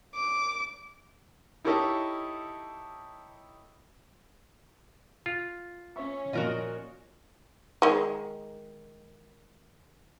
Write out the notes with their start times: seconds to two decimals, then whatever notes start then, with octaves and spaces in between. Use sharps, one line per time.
0.13 D6
1.64 D#4 E4 G4 A4 C#5 D#5
5.26 F4
5.96 C#4 C#5 E5 C#6
6.33 A#2 F3 F#4 A#4 D#5
7.82 D#3 G#3